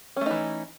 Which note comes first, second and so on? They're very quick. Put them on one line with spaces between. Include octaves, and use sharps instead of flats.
C#4 A3 D#4 E3